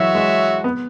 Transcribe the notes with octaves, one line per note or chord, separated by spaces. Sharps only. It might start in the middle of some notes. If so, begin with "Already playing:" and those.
Already playing: E3 F#3 G#3 F#4 C#5 E5
G#3
B3